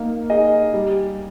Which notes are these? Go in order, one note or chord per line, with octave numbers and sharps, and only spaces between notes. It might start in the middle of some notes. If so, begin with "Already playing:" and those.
Already playing: A#3 D#4
D#4 G#4 D#5
G3